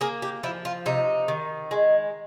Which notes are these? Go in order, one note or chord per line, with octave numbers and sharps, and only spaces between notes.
A#3 G#4
G4
F3 E4
F4
C3 D#4
D#3
G#3